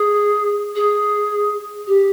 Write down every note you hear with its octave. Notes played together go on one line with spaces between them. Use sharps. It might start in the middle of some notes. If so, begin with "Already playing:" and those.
Already playing: G#4
G#4
G4